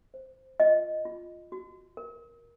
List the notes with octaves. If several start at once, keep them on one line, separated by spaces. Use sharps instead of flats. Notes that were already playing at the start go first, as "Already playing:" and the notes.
C5
F4 D#5
F4
F#4
A#4